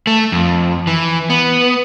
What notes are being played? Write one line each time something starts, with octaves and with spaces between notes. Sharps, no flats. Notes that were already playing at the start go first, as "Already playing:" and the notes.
A3
F2
E3
B3